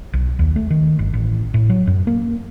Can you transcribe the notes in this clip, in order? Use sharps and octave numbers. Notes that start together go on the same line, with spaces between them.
B1
D#2
A3
D#3
G1
A1
A2
F#3
F#2
A#3